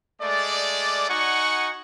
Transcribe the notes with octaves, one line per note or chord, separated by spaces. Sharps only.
G#3 A3 D5
D#4 F#4 F#5 G#5 C#6